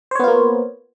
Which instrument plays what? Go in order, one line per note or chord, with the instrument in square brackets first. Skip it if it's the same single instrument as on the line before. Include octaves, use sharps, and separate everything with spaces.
[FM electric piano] C5
C#5
B3
F4
A#3